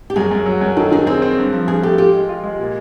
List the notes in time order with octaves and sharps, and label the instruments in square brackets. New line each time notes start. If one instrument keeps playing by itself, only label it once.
[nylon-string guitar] G4
[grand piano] F#2 [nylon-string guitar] G#4
[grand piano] F#2
F#3
F#2
[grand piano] D#3 [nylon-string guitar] A4
[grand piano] D#3 [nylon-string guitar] G#4
[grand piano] C4 [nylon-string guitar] G#4
[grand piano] C4
G2
F3
[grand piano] G2 [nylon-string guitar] G#4
[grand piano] A3 [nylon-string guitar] G4
[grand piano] F4 [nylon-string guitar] G4
[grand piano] G#3
F4
G#3
A#2